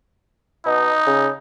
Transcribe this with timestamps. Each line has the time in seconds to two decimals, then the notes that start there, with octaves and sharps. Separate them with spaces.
0.65 B2 D#4
1.06 C#3